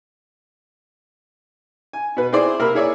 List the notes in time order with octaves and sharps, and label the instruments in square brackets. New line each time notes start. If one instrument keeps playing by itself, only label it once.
[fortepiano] G#5
B2 B4
C4 E4 G#4 C5 D5 C6
C3 A#3 A#4 B5 E6
E4 G#4 C#5 D5 E5